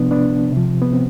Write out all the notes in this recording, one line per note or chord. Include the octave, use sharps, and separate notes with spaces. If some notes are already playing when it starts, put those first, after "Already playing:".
Already playing: C3 F3 B3 D4
B3 D4
C3 F3
B3
C4